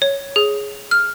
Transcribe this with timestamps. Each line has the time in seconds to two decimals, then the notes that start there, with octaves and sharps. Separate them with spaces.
0.02 C#5
0.36 G#4
0.91 F6